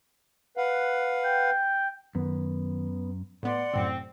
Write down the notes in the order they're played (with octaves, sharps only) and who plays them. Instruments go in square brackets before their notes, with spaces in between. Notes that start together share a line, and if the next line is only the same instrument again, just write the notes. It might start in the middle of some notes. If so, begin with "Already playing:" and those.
[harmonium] B4 F5 F#5
[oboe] G5
[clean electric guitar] F#2 [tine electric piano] D#3 [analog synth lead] B3
[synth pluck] A2 B3 [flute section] D5 F#5 C6
[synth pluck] F#2 A2 C3 [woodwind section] C4